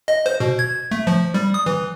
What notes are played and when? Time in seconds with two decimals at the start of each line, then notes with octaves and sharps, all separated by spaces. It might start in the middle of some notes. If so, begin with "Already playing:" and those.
0.08 D#5
0.26 C5
0.40 B2
0.59 G#6
0.91 A3
1.07 F3
1.34 G3
1.54 D#6
1.66 E3